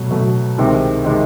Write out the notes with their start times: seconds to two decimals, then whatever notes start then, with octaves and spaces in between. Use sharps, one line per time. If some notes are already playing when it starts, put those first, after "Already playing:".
Already playing: B2 F#3 A3
0.10 B2 F#3 A3
0.58 C2 C3 D#3 G#3 C4
1.05 C3 D#3 G#3 C4